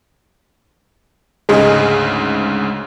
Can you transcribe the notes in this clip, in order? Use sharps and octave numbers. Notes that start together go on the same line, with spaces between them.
D2 G#2 C#3 G#3